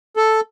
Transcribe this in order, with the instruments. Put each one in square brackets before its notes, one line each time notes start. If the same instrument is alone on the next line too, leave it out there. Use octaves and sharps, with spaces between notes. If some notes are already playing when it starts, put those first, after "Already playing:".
[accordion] A4